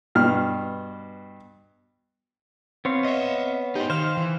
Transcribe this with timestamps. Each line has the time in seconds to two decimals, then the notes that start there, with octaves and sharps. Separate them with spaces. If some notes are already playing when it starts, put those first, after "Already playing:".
0.15 G2 B2 F6
2.85 B3 C4 C#5 F5
3.05 D#5 E5
3.76 D#4 G4 C5
3.90 D#3 C5 F5 F6
4.17 E3